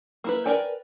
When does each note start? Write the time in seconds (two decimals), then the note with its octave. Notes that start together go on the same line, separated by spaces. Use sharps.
0.24 A#3 E4 B4
0.46 A#4 B4 D5 G5 G#5